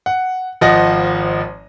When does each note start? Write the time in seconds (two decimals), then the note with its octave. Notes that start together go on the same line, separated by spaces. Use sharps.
0.06 F#5
0.61 G#1 F3 D#5 F#5 A#6